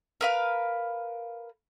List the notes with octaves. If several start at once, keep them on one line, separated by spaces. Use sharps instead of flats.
A#4 B4 F5